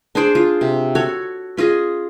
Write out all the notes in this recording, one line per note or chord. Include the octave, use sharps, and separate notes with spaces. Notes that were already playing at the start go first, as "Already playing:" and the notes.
D4 G#4 C5 D5
F4
C3
F#4 A4 C#5
C#4 F4 G#4 D#5